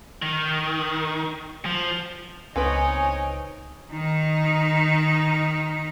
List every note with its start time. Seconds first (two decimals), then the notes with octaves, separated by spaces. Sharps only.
0.22 D#3
1.65 F3
2.56 C#2 B3 C4 D#4 B4 C#5 G#5 D7
3.92 D#3 D#4